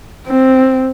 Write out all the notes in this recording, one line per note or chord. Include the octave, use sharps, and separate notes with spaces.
C4